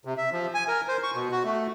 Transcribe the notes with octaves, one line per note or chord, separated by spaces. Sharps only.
C3
E5
F3
G#5
A#4
C5
C#6
B2
F#4
A3